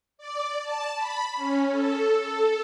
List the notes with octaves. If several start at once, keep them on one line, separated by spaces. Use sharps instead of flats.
D5
A5
B5
C#4
A4
A4